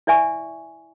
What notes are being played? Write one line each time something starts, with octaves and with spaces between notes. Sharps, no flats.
E4 D5 E5 G#5 C#6